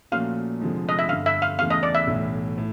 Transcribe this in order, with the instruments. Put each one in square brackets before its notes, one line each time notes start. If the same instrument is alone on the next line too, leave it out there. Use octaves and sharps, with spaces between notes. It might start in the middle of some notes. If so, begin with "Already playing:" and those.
[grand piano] A#2 F3 A3 C#4 F#4 [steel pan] F5
[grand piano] F1 F2 D3 F3 G#3
[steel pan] D#5
E5
[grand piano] G1 G2 D3 [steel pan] F5
[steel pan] E5
F5
[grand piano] E2 C#3 E3 A3 [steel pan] F5
[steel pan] D#5
D5
E5
[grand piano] B1 A2 E3
A2